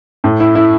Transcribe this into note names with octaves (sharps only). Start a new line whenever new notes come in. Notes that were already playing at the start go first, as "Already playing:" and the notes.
A2
E4
E4